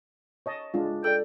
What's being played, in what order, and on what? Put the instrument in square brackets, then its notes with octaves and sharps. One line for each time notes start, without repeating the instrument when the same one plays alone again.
[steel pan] C#5 D#5 A5
G#3 D4 F4
[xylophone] A4 D5 [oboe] G5